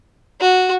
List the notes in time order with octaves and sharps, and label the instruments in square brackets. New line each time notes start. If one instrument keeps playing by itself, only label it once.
[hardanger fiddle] F#4